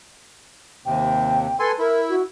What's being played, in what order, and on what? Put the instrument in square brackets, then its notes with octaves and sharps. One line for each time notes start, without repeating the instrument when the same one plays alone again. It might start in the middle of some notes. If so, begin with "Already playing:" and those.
[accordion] D#2 C3 [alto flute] G5
[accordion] A4 G#5 C6 [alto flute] B4
[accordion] E4 [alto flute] A#4
[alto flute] F#4